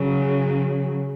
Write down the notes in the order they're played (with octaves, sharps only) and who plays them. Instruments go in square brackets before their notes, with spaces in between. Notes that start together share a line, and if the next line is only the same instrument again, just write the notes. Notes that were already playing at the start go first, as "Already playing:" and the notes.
Already playing: [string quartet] C#3 F#3